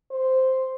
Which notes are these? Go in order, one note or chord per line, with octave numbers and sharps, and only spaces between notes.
C5